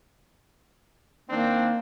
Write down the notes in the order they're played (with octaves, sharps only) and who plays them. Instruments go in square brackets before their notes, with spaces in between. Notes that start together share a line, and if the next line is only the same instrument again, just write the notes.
[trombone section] D#3 C4 D4 [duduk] A#3